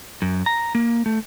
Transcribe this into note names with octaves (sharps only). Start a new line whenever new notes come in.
F#2
A#5
A#3
A3